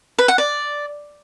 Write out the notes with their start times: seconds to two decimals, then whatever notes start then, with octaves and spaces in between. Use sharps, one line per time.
0.18 B4
0.28 F#5
0.38 D5